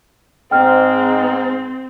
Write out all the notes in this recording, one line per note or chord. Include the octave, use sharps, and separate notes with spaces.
G#2 C4 G5 F6